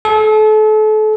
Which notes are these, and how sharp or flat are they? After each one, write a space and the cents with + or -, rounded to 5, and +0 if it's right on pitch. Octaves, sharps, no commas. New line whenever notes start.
A4 -35